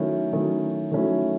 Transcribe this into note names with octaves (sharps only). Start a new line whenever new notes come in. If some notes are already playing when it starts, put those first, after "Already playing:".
Already playing: D#3 F#3 A3 C#4 E4
D#3 F#3 A3 C#4 E4
D#3 F#3 A3 C#4 E4